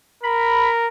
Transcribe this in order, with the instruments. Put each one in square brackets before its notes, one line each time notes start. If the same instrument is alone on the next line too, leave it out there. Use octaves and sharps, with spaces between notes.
[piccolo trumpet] A#4 [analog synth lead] B5